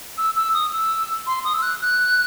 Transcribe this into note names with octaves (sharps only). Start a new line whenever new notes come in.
E6
E6
D#6
E6
C6
D#6
E6
F#6
F#6